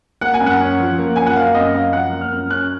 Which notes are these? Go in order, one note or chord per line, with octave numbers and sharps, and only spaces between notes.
A#3 F#5
G#5
F#2
F#5
C#4
F3
A#3
F#2 G#5
F#5
A#3 F5
F#2 D#5
F#2 F5
F3 F#5
A#3
F6
F#2
C#4 F#6